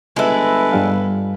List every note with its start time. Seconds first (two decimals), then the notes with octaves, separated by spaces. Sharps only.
0.16 G1 G#3 E4 A4 B4
0.72 G2 G3 F5